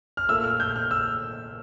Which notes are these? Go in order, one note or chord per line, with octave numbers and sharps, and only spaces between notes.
F6
A#2 A3 E6
F6
G6
F6
E6